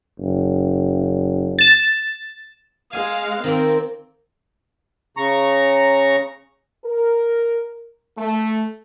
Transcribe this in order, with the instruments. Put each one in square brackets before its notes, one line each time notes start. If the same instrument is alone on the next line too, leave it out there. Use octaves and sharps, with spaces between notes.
[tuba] F#1
[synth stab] A6 E7
[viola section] G#3 F5 [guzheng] G#5
[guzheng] D#3 A#3 [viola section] C4
[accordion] C#3 A#5 C#6
[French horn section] A#4
A3